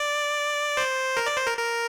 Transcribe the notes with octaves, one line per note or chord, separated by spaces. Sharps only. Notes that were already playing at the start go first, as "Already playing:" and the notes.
Already playing: D5
C5
A#4
D5
C5
A#4
A#4